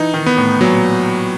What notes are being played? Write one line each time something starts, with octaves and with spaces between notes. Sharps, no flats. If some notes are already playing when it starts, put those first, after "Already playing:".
Already playing: E3 D#4
D#3
B3
A2
A#2 F#3